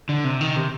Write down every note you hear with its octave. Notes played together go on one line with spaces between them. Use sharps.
D3
C3
D#3
C3